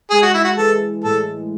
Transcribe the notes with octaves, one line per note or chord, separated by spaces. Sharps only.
G#3 G#4
F#4
E4
F#4
E3 A4
A2 A4